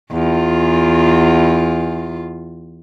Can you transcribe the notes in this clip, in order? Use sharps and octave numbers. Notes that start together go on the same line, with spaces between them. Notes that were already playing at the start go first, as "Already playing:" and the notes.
E2 F4